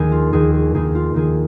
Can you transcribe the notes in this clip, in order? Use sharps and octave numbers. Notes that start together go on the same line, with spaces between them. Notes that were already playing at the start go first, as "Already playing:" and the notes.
Already playing: D#2 D#3 G#4
F4
D#2 D#3 G#4
G#4
D#2 D#3 G#4
F4
D#2 D#3 G#4